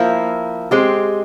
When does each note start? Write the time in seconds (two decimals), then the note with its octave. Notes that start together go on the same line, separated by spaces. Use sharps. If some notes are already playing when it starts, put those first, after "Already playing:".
Already playing: F3 A#3 E4
0.71 G#3 C4 G4